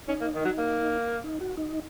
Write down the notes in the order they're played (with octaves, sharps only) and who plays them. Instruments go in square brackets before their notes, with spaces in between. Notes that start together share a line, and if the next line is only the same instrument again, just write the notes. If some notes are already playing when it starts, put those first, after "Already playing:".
[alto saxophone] C#4 [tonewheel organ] D#4
[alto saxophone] A#3
D#3
F#3
A#3
[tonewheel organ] D#4
F#4
D#4